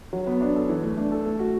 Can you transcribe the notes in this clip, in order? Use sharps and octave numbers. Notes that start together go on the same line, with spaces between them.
F#3
B3
D4
A4
E3
A3
D4
A4
A3
F#4